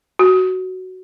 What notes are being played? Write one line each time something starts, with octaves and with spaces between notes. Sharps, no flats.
F#4